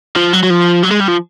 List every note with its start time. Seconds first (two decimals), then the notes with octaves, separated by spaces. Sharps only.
0.16 F3
0.33 F#3
0.43 F#3
0.50 F3
0.83 F#3
0.91 G#3
1.00 G3
1.08 F3